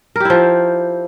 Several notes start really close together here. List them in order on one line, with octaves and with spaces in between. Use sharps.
A#4 G4 E4 F3